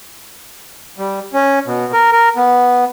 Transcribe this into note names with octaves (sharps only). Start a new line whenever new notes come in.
G3
C#4
B2
A#4
A#4
B3